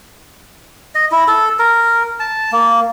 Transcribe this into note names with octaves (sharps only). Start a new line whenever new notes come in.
D#5
E4
A4
A#4
A5
A#3